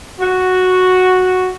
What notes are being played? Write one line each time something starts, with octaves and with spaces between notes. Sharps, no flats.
F#4